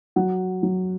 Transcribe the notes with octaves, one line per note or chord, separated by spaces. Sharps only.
F#3 F#5
F#3